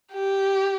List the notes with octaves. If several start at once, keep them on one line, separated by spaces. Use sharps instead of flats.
G4